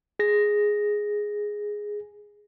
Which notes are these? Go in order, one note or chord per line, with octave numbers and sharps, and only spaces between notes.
G#4 A#6